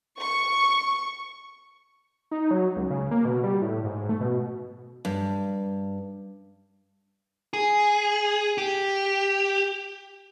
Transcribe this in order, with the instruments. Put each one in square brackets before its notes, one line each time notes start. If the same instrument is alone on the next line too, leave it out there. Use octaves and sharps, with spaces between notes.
[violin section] C#6
[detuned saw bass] D#4
F#3
C#2
C#3
A#3
B2
G3
A2
G#2
A3
B2
[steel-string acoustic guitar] G2
[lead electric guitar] G#4
G4